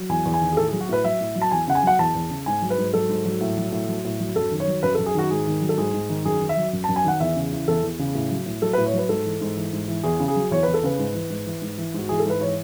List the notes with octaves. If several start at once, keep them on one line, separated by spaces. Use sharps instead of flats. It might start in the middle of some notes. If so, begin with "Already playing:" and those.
Already playing: F#3
E2 G#5
E2
G#5
D#3
G#4
A2 A4
G#4
F#3
F#4
A2 B4
F#3 E5
A2
F#3
A5
E2 G#5
C#3 F#5
G#5
F#3 F#5
E2 A5
E2
C#3
G#2 G#5
F#3
B4
G#2
F#3 A4
G#2
F#3
A2
F#3
A2
F#3
A2
F#3
F#2 A4
D#3
C#5
F#3
F#2 B4
A4
F#2
G#4
D#3 F#4
G#2 G#4
D#3
F#3
A4
G#2 G#4
G#2
D#3
F#2 G#4
D#3
E5
F#3
F#2
A5
F#2
G#5
D#3 F#5
E2 E5
C#3
E3
E2 A4
E2
C#3
A2
F#3
A2
F#3 A4
B4
A2
C#5
F#3 B4
G#2 A4
E3
G#2
E3
G#2
E3
E2 G#4
C#3
G#4
F#3
E2 C#5
E2 B4
A4
C#3 B4
G#2
E3
G#2
E3
G#2
E3
G#2 F#4
E3 G#4
A4
G#2 B4
E3 C#5